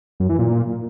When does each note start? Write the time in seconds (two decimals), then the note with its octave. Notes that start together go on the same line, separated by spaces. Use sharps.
0.20 F#2
0.29 E3
0.39 A#2